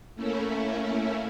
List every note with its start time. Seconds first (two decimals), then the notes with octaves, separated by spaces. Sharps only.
0.15 A3 A#3 C#4 E4